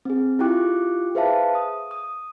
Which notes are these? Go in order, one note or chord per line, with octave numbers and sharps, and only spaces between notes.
C4 G#4
E4 F4 G4 G5 D6 F#6
G#4 B4 C5 E5 F5 A5
D#6
D#6